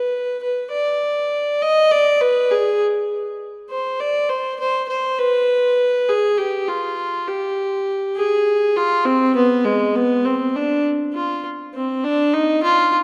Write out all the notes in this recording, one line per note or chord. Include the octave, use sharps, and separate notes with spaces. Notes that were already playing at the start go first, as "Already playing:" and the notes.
Already playing: B4
B4
D5
D#5
D5
B4
G#4
C5
D5
C5
C5
C5
B4
G#4
G4
F4
G4
G#4
F4
C4
B3
G#3
B3
C4
D4
F4
C4
D4
D#4
F4